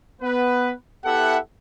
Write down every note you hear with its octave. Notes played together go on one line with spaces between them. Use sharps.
B3 B4
B3 E4 G4 A4 E5 F#5